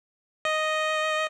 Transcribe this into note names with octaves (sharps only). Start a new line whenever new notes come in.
D#5